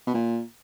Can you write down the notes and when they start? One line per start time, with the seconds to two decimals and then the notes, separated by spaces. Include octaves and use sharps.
0.07 B2
0.14 A#2